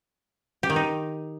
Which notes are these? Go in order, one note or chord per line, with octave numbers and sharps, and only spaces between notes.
G4
D#3
D#4